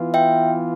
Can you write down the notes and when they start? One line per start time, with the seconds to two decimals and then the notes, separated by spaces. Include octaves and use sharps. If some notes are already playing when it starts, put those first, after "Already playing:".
Already playing: E3 B3 F4
0.14 E5 G5